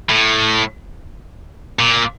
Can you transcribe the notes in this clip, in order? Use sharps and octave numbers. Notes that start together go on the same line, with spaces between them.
A2
A#2